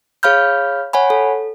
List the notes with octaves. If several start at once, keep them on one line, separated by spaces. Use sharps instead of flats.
G#4 C#5 F5 B5 F6 G6
C#5 F#5 G#5 B5
A4